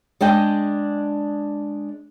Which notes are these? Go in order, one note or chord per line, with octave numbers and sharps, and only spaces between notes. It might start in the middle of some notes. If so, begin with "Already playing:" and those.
G#3 D4 D#5 G5